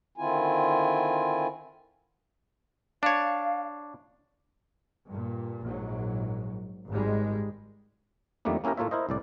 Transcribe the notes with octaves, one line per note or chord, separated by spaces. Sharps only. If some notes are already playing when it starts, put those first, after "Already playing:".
D3 D#3 C4 E4 F4 G#5
D4 C#5 F5
G2 A#2
A#1 G#2 F#3
G#1 G#2 G3 G#3
F2 D#3 G3 A3 A#3 D4
A#3 C#4 E4 G4 A#4
A2 A3 A#3 F4 C#5 E5
E4 A#4 C5 D#5
C2 A2 D5